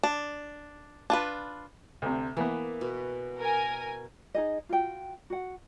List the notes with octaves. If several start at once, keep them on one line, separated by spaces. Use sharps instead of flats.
D4
D4 F4 B4
D2 C3
E3 A#3 B3
B2
A#4 G#5
D#4 G#4 D#5
F4 F#4 G5
F#4 F#5